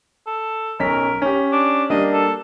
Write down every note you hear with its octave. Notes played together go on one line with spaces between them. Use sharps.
A4
B1 C#4 A#4 B6
C#4 G4
D4
G3 A#3 D4 D#5
A4